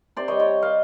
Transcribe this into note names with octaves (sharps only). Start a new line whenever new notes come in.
C3 C5 D5
G3 C#5 D#5
C#5 D#5
C3
D#5 F5